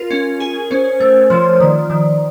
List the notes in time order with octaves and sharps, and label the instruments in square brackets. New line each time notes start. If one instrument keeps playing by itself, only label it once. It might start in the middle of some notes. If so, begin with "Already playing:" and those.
Already playing: [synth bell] F4 [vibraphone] A#4
[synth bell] C#4
G#4
[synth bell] C#4 [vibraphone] C5
[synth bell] A3 [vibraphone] C5
[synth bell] F3 [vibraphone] C#5
[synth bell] D#3 [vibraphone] D5
[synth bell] D#3